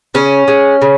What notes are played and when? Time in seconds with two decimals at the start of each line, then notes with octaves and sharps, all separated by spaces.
0.14 C#3 C#4
0.48 G#3
0.82 C#3